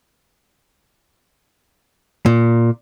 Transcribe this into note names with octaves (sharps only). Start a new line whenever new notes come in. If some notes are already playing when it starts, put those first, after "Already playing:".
A#2